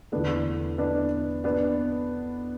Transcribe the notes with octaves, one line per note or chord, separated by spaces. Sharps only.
E2 D3 A3 B3 D4
B3 D4
B3 D4